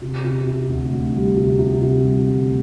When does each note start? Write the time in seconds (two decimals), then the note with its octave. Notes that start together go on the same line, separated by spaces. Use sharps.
0.02 C3
0.24 C3
0.47 C3
0.69 D2
0.92 D2
1.15 G3
1.36 C3
1.59 C3
1.81 C3
2.04 G3
2.26 D2